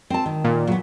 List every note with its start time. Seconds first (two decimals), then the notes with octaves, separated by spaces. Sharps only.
0.10 C4 A5
0.26 D#3
0.45 A#2
0.67 F#3 B3